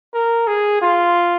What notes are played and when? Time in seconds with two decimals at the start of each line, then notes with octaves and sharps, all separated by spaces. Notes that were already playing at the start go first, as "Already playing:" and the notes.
0.14 A#4
0.47 G#4
0.82 F4